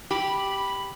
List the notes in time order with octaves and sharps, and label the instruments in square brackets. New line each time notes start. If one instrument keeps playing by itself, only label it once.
[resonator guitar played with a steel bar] G4 [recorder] B5